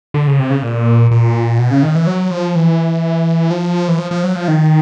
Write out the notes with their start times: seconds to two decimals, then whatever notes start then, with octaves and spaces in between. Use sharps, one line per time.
0.14 D3
0.27 C#3
0.39 C3
0.50 C#3
0.62 A#2
1.11 A#2
1.59 B2
1.71 C#3
1.83 D#3
1.95 E3
2.07 F#3
2.31 F3
2.55 E3
3.51 F3
3.88 E3
3.99 F3
4.11 F3
4.24 F#3
4.36 F3
4.48 D#3